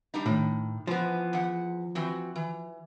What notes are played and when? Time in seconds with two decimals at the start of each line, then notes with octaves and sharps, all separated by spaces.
0.14 G3 D4 D#4
0.26 A2 D#3
0.87 E3 F3 B3
1.33 E2 F#5
1.95 E3 C4 F#4
2.35 E3